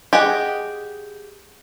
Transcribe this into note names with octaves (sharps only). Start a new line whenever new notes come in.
G4 G#4 D#5 F#5